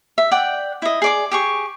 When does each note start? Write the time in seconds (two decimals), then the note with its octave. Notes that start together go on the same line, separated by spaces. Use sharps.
0.18 E5
0.31 D5 F#5 G5
0.82 E4 D#5
1.02 G#4 D5 D6
1.31 G4 G#4 C#6